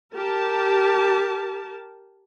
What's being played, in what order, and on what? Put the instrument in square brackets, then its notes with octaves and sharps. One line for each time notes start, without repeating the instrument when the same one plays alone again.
[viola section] G4 A#4 A5